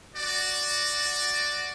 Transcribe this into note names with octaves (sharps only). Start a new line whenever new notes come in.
F#4 D5